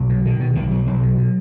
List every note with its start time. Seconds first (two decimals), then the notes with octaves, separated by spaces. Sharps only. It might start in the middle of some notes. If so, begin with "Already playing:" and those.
Already playing: B1 F#3
0.09 B2
0.25 B2 D#3
0.40 B2
0.55 B1 D#3
0.71 B1 F#3
0.86 B1 F#3
1.02 B2
1.18 B2